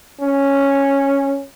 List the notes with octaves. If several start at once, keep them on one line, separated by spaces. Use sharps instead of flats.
C#4